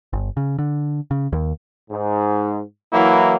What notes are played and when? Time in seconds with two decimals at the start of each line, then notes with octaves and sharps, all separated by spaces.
0.13 G1
0.37 C#3
0.59 D3
1.11 C#3
1.33 D#2
1.90 G#2
2.93 E3 F#3 A#3 E4